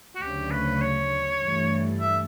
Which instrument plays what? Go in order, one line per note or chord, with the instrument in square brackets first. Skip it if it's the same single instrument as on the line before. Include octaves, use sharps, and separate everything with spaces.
[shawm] F#4
[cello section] D2 C#3 F#3 C#4 [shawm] G4
[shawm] B4
C#5
[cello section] G2 E3 A3
[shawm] E5